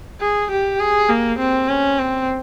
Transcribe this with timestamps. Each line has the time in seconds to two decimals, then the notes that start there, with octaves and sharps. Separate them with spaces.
0.21 G#4
0.51 G4
0.80 G#4
1.09 A#3
1.39 C4
1.69 C#4
1.99 C4